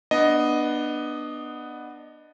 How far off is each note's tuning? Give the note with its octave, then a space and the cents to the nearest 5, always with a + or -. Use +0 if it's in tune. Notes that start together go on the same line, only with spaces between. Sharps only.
B3 -10 D4 +20 D#5 +0